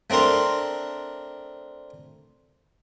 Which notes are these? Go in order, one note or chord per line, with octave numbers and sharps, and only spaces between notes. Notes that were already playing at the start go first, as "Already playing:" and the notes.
A3 C4 D4 A#4 C6